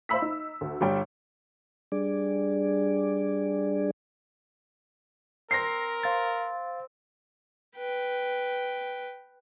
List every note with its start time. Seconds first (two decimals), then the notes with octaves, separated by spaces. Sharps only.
0.09 C5 E5 F5 B5 E6 B6
0.22 D#4
0.61 D2
0.81 G1 G3 G5
1.92 G3 D4 G#4 D5
5.51 C4 A#4 A#6 C7
6.03 C4 F5 A6
7.77 B4 G5